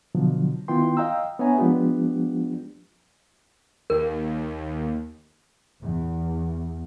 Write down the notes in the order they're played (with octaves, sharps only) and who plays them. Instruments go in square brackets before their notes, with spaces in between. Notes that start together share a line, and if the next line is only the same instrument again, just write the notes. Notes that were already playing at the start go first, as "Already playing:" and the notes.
[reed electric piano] B2 D3 F3 F#3
D#3 B3 E4 F4 G5 C6
D#5 F5 G5 A#5 E6
B3 D4 C#5 E5 G#5 A#5
F3 G#3 B3 D4 F4 G4
[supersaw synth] D#2 [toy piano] A#4
[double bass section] E2